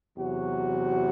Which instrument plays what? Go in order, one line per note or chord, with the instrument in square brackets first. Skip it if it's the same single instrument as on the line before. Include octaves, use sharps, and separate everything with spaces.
[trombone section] E2 C3 F#3 F#4